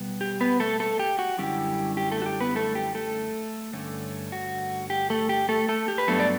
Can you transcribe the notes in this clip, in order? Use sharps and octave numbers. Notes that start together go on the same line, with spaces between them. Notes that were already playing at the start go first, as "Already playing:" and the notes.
Already playing: B2 G3 B3
G4
B3 B4
A3 A4
A3 A4
G4
F#4
F#2 D3 G3 C#4 E4 G4
G4
A3 A4
F#4
G4
B3 B4
A3 A4
G4
A3 A4
G2 D3 A3 C#4
F#4
G4
A3 A4
G4
A3 A4
A3 A4
G4
B4
G2 F#3 A3 B3 D4 A4
D5